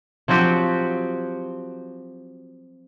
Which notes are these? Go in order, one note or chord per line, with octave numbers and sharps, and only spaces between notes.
F3 F#3 C4 F#4 G4